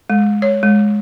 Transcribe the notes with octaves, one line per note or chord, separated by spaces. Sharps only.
G#3
C#5
G#3